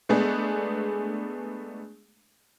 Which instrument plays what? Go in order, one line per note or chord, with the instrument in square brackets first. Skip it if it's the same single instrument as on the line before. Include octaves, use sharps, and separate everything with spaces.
[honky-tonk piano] G#3 A3 B3 D4 G#4